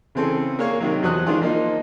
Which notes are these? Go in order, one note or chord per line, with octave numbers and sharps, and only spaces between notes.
C#3 E3 C4 G#4 A4
A#3 G#4 C#5 F5 C#6
C3 D#3 F#3
E2 F3 F#4 C5 D#6 F#6
D#3 E3 G#3 D4 F4 G#4
F3 A#3 D#4